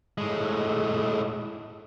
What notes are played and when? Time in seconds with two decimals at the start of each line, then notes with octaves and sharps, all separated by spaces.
0.18 A2 G#3